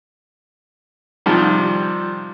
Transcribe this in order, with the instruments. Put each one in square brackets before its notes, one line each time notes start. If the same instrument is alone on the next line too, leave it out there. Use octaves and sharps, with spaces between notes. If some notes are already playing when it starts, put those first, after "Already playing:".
[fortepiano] C3 D#3 F3 G3